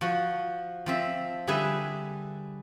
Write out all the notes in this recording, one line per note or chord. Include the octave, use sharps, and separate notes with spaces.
F3 F#4
F3 C4 E5
D3 G3 G#4 B4 E5 G#5